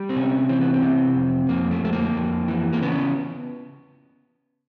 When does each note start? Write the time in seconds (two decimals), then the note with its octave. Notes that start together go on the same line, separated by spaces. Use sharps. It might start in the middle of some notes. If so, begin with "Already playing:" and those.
Already playing: G3
0.09 C4
0.16 C3 C#4
0.49 E3 C4
0.61 B3
0.74 C4
0.83 C3
1.16 F2
1.49 F2 A#3
1.71 A3
1.83 F2 A3
1.93 A#3
2.15 F2
2.48 E3
2.73 A#3
2.82 C#3 B3